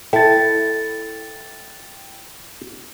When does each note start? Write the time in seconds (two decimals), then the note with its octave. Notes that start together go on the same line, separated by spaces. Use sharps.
0.13 E4 A4 G5 A6